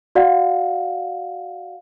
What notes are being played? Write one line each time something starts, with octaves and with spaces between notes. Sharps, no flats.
F#4 D5 F5 F#5